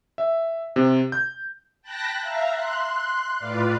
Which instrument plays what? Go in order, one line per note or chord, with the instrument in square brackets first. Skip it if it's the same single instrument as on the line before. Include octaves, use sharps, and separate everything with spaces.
[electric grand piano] E5
C3
G6
[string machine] G5 A5 B5 F#6 A#6
E5 F5 A#5
C6 F#6
A2 F4 B4 D5 F5